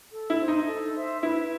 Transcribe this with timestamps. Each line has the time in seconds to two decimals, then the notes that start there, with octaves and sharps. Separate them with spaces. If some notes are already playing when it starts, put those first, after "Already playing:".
0.11 A4
0.30 E4
0.39 C5 E5
0.48 D#4
0.67 A4
0.95 C5 E5
1.23 E4 B4